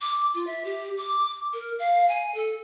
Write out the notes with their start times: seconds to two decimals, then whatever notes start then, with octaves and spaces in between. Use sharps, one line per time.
0.02 D6
0.34 F4
0.47 E5
0.65 G4
0.98 D6
1.53 A#4
1.79 F5
2.09 G#5
2.34 A4